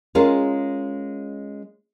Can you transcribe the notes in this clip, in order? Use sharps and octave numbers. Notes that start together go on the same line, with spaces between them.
G#3 C#4 F4 A#4